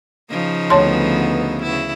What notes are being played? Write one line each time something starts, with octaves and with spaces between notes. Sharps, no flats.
C#3 F3 D#4
D2 B3 C#5 A5 C6
C#3 E4